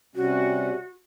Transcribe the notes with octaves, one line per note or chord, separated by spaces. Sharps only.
C3 G3 C#4 F#4